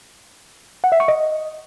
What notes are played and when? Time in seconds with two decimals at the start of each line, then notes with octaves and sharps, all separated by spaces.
0.84 F#5
0.92 E5
1.00 C#6
1.08 D#5